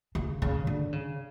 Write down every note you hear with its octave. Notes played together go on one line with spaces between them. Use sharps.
C#3
C#3
D3
C#3